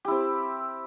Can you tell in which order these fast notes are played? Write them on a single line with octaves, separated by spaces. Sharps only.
G4 E4 C4